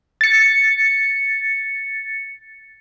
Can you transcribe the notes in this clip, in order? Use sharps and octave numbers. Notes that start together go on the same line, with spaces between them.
A6 C#7